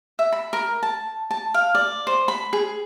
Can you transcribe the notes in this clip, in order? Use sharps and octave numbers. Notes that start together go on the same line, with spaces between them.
E5
B5
A#4
A5
A5
F5
D5
C5
B5
G#4